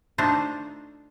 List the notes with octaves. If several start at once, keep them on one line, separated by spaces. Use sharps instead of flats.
A3 D4 D#4 F4 C5